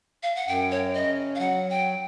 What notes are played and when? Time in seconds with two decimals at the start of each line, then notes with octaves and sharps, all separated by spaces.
0.23 F5
0.35 F#5
0.47 F#2 G5
0.71 C#5
0.93 C#3 D#5
1.35 F5
1.39 F#3 F#5
1.70 G5